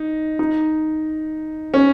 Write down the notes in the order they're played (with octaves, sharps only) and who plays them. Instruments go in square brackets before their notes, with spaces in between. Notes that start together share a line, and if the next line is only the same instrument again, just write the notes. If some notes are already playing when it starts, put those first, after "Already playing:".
Already playing: [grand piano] D#4
D#4
C#4